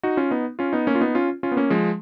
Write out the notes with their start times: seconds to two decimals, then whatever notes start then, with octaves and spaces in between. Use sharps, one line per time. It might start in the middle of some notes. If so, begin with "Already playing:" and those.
0.03 D#4 F#4
0.17 C#4 F4
0.31 B3 D#4
0.59 C#4 F4
0.73 B3 D#4
0.87 A#3 C#4
0.95 F4
1.01 B3 D#4
1.15 C#4 F4
1.43 C#4 F4
1.52 B3
1.56 A#3 C#4
1.70 F3 G#3